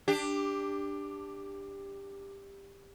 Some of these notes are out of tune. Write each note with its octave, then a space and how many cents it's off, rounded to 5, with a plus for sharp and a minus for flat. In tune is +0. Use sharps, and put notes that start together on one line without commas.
D4 +0 G4 +15